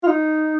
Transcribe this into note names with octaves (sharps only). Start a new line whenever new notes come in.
F4
D#4